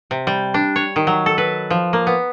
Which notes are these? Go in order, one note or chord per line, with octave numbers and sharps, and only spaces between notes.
C3
G3
D4
C#5
D#3
F#3
A4
B4
F3
A#3
B3